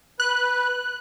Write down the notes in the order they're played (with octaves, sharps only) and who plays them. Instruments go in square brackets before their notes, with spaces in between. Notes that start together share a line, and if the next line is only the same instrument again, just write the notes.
[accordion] B4 [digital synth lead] F#6